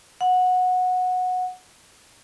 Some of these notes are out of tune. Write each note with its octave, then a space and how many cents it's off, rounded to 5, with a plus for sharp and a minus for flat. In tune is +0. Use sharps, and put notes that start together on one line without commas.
F#5 -15